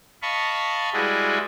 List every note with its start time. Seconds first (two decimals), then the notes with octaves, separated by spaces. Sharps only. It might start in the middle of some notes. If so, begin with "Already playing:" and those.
0.22 D#5 F5 A5 B5 C#6
0.93 G3 G#3 E4 F#4 G#4 B4